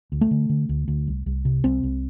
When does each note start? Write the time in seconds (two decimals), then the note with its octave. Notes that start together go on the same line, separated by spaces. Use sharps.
0.12 D2
0.21 A3
0.31 D3
0.49 D3
0.69 D2
0.88 D2
1.07 C2
1.26 C2
1.45 C3
1.64 C2 C4
1.83 C2